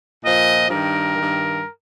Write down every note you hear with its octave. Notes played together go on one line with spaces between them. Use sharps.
A#2 F3 D#5
G2 D#3 A#4
G2 D#3